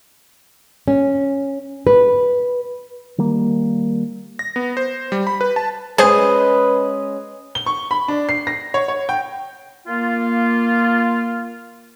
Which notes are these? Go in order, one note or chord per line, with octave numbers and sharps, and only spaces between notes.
C#4
B4
D#3 G3 A#3
A#6
B3
C5
G3
B5
B4
A5
G#3 C#4 G#4 B4 C5 D#5 G#5
G7
C#6
B5
D4
C7
A#6
C#5
C#5
G5
A#3 F4